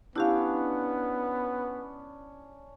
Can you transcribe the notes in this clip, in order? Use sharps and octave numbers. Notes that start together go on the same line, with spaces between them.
B3 C#4 D4 E4 G4 F5